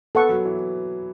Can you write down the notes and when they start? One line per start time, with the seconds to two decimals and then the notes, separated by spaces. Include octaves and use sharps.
0.15 B3 A4 F#5 C#6
0.29 F#3
0.45 E3